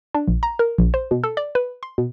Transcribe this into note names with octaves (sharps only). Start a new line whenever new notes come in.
D4
A#1
A#5
A#4
A#1
C5
B2
A4
D5
B4
C6
B2